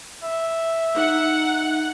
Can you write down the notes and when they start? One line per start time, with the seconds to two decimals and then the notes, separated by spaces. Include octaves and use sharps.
0.23 E5
0.96 D#4 F#5